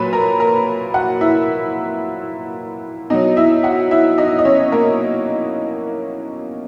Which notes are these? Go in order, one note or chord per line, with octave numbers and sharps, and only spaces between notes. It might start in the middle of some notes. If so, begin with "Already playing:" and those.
Already playing: A#2 F#3 B4 B5
A#4 A#5
A#4 A#5
F#4 F#5
E4 E5
B2 F#3 D#4 D#5
E4 E5
F#4 F#5
E4 E5
D#4 D#5
D#5
C#4 C#5
A#3 A#4